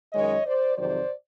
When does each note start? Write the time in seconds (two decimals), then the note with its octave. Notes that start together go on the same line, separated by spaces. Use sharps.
0.13 F#2 D#3 G#3 C#5 D#5
0.45 C5 D5
0.77 F2 C3 D#3 F#3 C5 D5